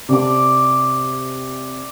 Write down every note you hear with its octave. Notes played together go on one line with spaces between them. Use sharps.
C3 D5 D6